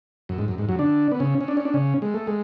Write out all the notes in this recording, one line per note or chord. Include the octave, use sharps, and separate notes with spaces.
F#2
G#2
F#2
G#2
F#2 F#3
D3 D4
B3
C#3 C#4
C#4
D4
C#4
D4
C#3 C#4
G#3
A3
G#3